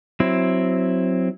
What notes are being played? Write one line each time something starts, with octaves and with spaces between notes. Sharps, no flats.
F#3 C4 E4